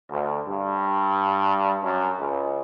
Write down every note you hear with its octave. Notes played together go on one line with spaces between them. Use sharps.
D2
G2
F#2
C#2